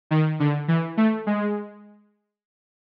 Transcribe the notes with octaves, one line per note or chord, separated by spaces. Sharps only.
D#3
D3
E3
A3
G#3